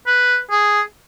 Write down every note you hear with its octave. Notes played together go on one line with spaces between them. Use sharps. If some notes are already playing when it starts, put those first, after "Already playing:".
B4
G#4